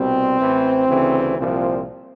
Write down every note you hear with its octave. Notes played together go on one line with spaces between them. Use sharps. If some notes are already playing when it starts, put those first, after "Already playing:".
Already playing: C2 B2 G3 C4
A1 A2 E3
D2 C#3 E3
C2 A#2 F3 C4